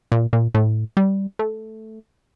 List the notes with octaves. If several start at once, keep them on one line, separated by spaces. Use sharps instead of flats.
A#2
A#2
A2
G3
A3